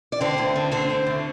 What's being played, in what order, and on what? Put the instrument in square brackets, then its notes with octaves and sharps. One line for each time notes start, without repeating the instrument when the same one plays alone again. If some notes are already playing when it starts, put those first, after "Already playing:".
[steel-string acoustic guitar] D5
D3 C4 C5
D2
D3
D3 C4 C5
D3
D2